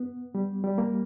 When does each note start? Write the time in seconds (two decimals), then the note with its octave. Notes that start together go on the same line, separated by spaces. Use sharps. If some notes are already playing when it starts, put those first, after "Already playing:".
Already playing: B3
0.35 G3
0.64 G3
0.78 A#3